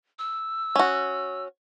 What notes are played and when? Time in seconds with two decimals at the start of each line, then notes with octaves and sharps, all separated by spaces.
0.19 E6
0.76 C#4 F#4